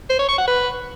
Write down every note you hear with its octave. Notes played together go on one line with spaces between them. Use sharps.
C5
C#5
C#6
F#5
B4